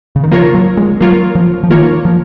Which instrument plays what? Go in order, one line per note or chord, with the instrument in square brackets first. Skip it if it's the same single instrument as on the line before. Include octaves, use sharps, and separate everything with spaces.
[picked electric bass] C#3
D#3
[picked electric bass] F3 [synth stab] A#3 F4 A#4 C#5
[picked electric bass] F#3
G#3
[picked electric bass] F#3 [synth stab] A#3 F4 A#4 C#5
[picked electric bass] F3
F3
[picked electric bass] D#3 [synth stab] A#3 F4 A#4 C#5
[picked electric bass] F3